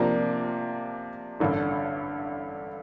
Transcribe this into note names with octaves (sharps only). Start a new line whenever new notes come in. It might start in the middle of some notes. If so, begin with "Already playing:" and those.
Already playing: C3 F3 A#3 D4
A1 G2 D3